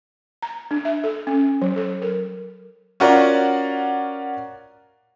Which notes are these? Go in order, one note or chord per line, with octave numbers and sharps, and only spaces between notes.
A#5
D4
E5
A4
C#4
F#3
A4
A#4
C#4 F4 F#4 A#4 D5